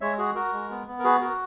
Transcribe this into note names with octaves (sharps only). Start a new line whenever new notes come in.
G#3 C#5 E5
F#4 G#4
F#4 A#4
G#3
B3
B3
A#4
F#4 G#4 B4
F#4 A#4